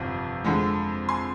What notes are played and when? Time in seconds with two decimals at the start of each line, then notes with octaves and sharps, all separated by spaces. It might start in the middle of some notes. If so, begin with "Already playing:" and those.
Already playing: G1 F2 C3
0.44 F2 D3 G#3
1.09 G#5 C6